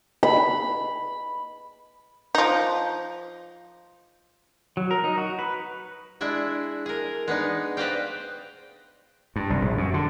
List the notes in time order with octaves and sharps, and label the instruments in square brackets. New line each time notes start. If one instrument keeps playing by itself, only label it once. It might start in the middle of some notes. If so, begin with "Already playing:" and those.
[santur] B5
[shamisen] F3 D#4
[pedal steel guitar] F#3
A#4
D#4
F#4
B4
[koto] G#3 D4 E4 E5
G#4 A#4
G#3 B3 D4 D#4
B4 C5 D5 D#5 F5 G5
[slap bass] G2
C2
A#1
F#2
D3